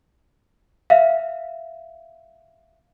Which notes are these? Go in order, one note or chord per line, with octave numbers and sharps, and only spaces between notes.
E5 F5